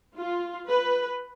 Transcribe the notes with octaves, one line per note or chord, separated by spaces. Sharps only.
F4
B4